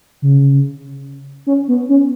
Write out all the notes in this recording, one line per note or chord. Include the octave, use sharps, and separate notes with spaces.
C#3
C#4
B3
C#4